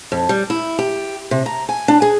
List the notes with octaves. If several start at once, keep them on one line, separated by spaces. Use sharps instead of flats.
F2
G3
E4
G4
C3
A#5
G#5
D4
G#4